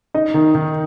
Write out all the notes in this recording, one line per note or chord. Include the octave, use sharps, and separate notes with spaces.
D#4 D#5
D#3
D#3